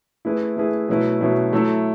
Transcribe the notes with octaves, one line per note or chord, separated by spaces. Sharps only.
A3 E4 G#4 B4
A3 E4 G#4 B4
B2 F#3 A3 E4 B4
B2 F#3 A3 E4 B4
F#3 A3 E4 A4